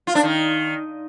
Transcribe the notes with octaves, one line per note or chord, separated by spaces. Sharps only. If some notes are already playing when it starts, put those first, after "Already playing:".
F4
D4
D#3